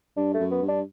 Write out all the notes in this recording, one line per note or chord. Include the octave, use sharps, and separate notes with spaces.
G2 D4
A3
F#2
B3
G2
D4